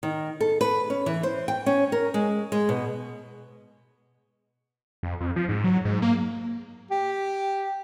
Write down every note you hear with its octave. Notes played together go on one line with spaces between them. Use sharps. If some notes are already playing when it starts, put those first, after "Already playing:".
D#3
A4
B4
C#4
E3
C5
G5
C#4
A#4
G#3
G#3
B2
F2
F2
F3
G#2
F#3
G#2
A#3
G4